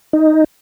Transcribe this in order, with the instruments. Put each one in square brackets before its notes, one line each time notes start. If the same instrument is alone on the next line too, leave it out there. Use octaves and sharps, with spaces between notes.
[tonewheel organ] D#4